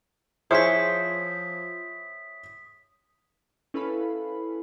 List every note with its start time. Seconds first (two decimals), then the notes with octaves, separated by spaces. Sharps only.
0.51 F3 E4 G#4 C5 C#5 D#6 F#6 B6
3.74 C#4 E4 A4 B4 F5 B5